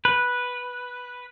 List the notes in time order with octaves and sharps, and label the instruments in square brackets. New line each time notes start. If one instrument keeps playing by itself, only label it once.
[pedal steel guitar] B4